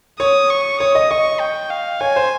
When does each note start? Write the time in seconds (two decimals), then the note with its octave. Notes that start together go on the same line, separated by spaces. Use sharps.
0.20 C#5 D#6
0.50 C#6
0.80 C#5 D#6
0.95 D#5
1.10 D#5 C#6
1.40 G5
1.70 F5
2.00 C#5 G#5
2.16 C5